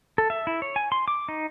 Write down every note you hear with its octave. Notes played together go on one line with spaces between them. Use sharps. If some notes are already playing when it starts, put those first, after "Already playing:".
A4
E5
E4
C#5
G#5
C6
D6
D#4